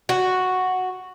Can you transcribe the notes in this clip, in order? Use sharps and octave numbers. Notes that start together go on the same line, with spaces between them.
F#4